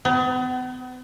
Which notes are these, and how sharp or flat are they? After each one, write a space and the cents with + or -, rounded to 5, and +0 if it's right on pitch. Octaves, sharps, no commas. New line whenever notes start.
B3 +40